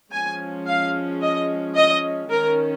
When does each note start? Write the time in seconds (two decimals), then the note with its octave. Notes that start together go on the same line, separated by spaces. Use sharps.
0.12 F3 G#3 C#4 G#5
0.66 F5
1.21 D#5
1.76 D#5
2.30 D#3 C#4 A#4